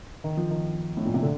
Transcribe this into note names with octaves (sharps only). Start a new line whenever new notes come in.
D#3
F3
D#3
A2
A#2
C3
D3